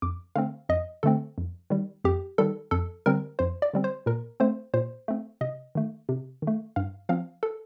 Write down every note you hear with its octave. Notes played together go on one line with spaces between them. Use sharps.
F2 D6
D3 A3 C4 F5
F2 D#5
D3 A3 C4 A4
F2
D#3 G3
F2 G4
D#3 G3 A4
F2 A4
D3 G3 C4 A#4
F2 C5
D5
D3 G3 C4
C5
A#2 A#4
A3 C4 C5
A#2 C5
A3 C4
C3 D#5
D#3 A3
C3
D#3
A3
G2 F5
F3 C4 F5
A4